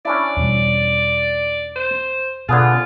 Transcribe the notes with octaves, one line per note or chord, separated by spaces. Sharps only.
C#4 D4 E4 D5
E2 B2 G3
C5
B2 D3 B3 F4 G#4